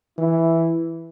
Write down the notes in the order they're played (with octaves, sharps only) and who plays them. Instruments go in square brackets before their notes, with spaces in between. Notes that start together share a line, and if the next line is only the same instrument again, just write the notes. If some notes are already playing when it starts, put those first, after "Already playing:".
[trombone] E3 [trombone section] E4